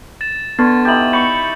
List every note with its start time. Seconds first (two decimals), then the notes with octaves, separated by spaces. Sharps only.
0.21 A6 E7
0.59 D3 B3 C#6 A6
0.85 D#4 E4 G4 A6 F#7
1.13 B5 C#6 G6 C#7 F#7